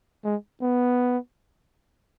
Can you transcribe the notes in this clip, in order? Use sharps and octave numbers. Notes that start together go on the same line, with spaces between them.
G#3
B3